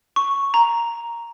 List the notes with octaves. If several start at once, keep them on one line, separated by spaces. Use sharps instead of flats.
C#6
A#5